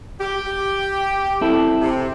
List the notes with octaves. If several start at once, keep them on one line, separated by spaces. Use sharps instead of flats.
G4
C4 E4 A4
C3